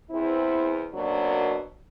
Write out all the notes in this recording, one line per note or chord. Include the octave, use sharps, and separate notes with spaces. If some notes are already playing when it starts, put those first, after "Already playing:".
E2 C4 E4
F#2 B2 F#3 A#3 C4 D4